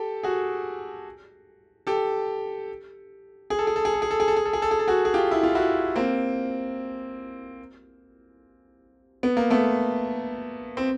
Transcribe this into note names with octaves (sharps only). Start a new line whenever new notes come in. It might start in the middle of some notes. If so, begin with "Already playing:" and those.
Already playing: G4 A4
F#4 G#4
G4 A4
G#4
A4
G#4
A4
G#4
A4
G#4
A4
G#4
A4
G#4
A4
G#4
A4
G#4
A4
F#4 G#4
G#4
F4 G4
E4
F4
E4 F#4
A#3 C4
B3
A#3
A3 B3
C4